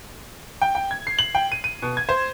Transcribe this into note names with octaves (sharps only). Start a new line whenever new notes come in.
G5
G5
G#6
C7
F#7
G5
D#7
D#7
B2
G#6
C5